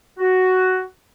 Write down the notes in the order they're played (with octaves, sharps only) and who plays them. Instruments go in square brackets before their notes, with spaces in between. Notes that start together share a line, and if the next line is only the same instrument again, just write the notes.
[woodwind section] F#4